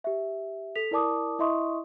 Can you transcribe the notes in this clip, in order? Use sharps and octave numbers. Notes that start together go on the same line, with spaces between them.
G4 E5
A4 B6 F7
E4 A#4 D5 A5 D6 D#6
E4 D#5 E5 C6 C#6 D#6